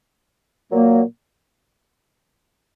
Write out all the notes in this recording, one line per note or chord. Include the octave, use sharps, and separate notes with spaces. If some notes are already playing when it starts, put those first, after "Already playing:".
A#2 F#3 A#3